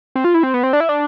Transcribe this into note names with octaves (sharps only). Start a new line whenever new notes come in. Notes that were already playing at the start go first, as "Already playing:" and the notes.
C4
F4
E4
C4
B3
C4
D4
E4
D4